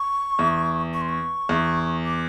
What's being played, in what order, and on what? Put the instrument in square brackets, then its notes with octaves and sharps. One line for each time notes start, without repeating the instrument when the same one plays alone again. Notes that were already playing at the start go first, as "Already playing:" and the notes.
Already playing: [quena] C#6
[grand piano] E2
[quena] C#6
C6
C#6
[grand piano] E2
[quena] D6